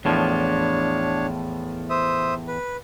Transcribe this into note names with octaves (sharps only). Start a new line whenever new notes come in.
E2 A2 F3 D4 C#5
C5 E5 D#6
B4